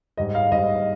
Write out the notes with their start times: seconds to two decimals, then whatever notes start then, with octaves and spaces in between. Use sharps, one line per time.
0.17 G#2 G3 D#5
0.35 F5
0.52 G#2 G3 D#5